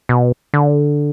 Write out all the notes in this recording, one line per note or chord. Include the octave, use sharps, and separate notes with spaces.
B2
D3